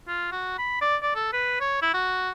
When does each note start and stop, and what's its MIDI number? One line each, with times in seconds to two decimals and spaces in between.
0.08 0.27 65
0.32 0.58 66
0.58 0.79 83
0.81 0.96 74
1.02 1.13 74
1.15 1.29 69
1.33 1.56 71
1.60 1.79 73
1.82 1.93 64
1.94 2.30 66